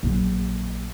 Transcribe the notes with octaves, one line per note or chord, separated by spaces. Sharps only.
A#1 F#3